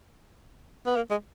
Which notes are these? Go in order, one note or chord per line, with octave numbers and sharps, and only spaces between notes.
B3
A#3
G#3